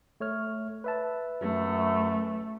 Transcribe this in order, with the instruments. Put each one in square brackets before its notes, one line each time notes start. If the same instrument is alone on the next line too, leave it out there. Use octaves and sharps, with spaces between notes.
[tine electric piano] A3 C#5 F6
B4 E5 A5
[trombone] F#2 [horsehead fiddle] A3